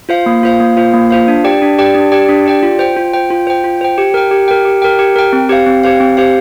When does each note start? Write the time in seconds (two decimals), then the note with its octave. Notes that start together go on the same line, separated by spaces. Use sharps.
0.09 F4 C5 F5
0.26 A#3
0.43 F4 C5 F5
0.60 A#3
0.77 F4 C5 F5
0.94 A#3
1.11 F4 C5 F5
1.28 D4
1.44 G4 D5 G5
1.62 D4
1.78 G4 D5 G5
1.95 D4
2.12 G4 D5 G5
2.29 D4
2.46 G4 D5 G5
2.63 F4
2.79 C5 G5
2.96 F4
3.13 C5 G5
3.30 F4
3.47 C5 G5
3.64 F4
3.81 C5 G5
3.98 G4
4.14 A#4 G5
4.31 G4
4.48 A#4 G5
4.65 G4
4.82 A#4 G5
4.99 G4
5.16 A#4 G5
5.33 C4
5.49 G4 C5 F5
5.67 C4
5.83 G4 C5 F5
6.00 C4
6.17 G4 C5 F5